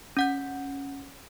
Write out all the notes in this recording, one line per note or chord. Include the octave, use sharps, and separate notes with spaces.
C#4 F#5 G6